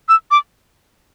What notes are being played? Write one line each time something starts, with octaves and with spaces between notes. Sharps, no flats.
E6
D6